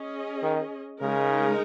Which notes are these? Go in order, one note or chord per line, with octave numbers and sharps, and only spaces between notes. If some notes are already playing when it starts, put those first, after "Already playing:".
Already playing: C#4 G#4 D#5
D#3
C#3 G#3 D#4 A#4